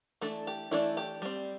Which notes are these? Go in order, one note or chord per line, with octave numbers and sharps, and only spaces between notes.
E3 A3 D4 A4
G4
E3 A3 D4 E4
G4
G3 C4